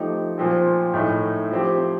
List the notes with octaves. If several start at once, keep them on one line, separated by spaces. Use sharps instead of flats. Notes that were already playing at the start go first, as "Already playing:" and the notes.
Already playing: F3 A3 D#4 G4
A#2 F3 C4
A2 A3 D#4
F3 C4 G4